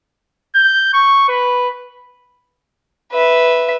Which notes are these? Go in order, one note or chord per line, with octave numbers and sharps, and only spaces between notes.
G6
C#6
B4
B4 E5